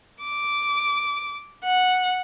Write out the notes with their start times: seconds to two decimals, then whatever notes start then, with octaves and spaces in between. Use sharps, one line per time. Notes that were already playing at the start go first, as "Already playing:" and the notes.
0.23 D6
1.64 F#5